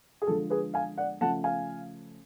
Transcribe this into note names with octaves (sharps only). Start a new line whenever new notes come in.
G#4
D3 F3 G#3 A4
G#4 B4
F5 G#5
D5 F#5
C#3 F3 A3 F#5 A5
F5 G#5